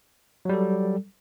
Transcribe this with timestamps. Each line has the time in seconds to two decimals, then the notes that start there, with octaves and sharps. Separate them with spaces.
0.45 F#3
0.49 G3
0.53 A4